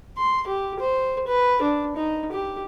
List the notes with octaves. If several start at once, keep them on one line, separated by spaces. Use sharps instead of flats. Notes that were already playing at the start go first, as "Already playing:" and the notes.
C6
G4
C5
B4
D4
D#4
G4